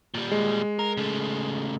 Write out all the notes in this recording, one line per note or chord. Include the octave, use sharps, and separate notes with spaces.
A#2 G3
G#3
A#4
C#3 A3